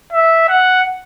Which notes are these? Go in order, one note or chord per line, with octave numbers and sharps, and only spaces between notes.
E5
F#5